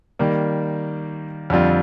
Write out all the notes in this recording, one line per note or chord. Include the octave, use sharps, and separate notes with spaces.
D#3 G3 A#3
F2 D3 G3 C4 F4